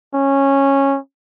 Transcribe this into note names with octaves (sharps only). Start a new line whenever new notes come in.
C#4